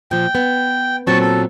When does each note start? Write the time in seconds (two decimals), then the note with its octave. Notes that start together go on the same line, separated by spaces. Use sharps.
0.11 A#2 F3 G5
0.35 B3
1.07 A#2 F#3 C4 A5 C#6
1.21 A4